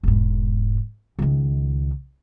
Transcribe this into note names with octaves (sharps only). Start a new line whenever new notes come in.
E1 G#2
C#2 D#3